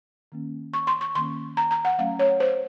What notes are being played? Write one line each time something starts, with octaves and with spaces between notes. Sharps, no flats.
D#3 A#3 C#4
C#6
C6
C#6
D#3 A#3 C#4 C6
A#5
A#5
F#5
F#3 A3 C#4 F5
C#5
C5